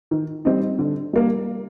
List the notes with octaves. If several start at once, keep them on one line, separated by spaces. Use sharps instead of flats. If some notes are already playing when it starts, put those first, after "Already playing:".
D#3
G3 C4 D#4
D3
G3 A#3